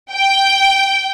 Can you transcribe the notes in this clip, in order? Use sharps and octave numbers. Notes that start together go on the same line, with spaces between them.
G5